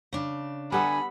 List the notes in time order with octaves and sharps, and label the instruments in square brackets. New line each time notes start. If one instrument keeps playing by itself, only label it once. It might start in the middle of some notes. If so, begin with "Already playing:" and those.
[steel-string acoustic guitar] C#3 D4
[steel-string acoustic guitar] D3 D4 F#5 [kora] G3 B3 A4 [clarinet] G#5 [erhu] B5